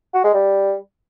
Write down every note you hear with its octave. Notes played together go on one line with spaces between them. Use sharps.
F#4
G#3
G3